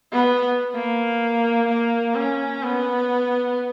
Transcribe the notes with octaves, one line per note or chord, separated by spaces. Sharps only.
B3
A#3
A#3
C#4
B3